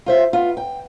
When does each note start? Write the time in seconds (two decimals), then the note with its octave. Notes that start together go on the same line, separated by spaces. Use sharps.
0.06 F4 C5 E5
0.33 B3 F4
0.57 G5